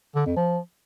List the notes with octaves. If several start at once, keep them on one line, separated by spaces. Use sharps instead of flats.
D3
F2
F3